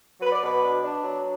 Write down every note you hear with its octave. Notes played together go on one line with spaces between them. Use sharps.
F#3 B4
D5
B2 B4
D4
D4
F#3